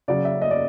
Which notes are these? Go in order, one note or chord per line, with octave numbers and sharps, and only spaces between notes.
C#3 F#3 D5
E5
D#5
D5